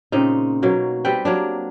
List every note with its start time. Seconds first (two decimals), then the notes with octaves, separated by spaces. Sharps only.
0.12 A#2 C#3 C4 D#4
0.63 B2 F#3 A#3
1.05 G3 C4 B4 G5
1.25 F#3 A#3 D4